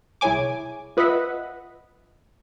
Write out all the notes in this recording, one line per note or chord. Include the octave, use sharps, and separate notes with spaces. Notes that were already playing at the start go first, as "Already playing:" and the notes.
C2 E4 G#4 C#5 G#5 D6
F4 B4 D#5 E5 F#5 B5